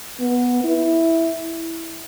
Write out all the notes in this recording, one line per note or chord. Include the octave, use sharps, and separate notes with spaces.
B3
E4